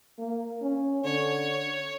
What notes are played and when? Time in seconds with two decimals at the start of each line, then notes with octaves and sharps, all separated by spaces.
0.18 A#3
0.62 C#4
1.04 D3 C#5